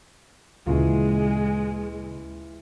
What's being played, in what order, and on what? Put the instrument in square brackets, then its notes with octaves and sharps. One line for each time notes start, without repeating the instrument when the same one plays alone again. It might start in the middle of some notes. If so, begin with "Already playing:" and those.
[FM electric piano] D2 A#2 C#3 [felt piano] E3 F4 [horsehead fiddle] G#3